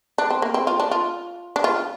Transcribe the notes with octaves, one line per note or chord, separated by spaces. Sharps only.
D4
C4
A#3
C4
F4
D4
F4
D4
F4